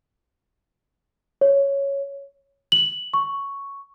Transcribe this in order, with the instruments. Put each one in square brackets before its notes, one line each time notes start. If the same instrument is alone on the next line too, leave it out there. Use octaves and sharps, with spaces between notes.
[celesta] C#5
F#7
C#6